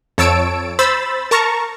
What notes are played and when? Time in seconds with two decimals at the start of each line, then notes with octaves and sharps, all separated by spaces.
0.18 F2 C#5 A5 E6 D7
0.79 C5 B5 E6 A6
1.31 A#4 A5 A#5 C#6